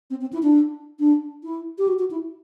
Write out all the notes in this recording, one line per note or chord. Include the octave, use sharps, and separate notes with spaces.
C4
C4
E4
D4
D4
E4
G4
F#4
F#4
E4